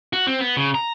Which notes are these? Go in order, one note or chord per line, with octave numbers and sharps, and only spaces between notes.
F#4
C4
B3
C#3
A#5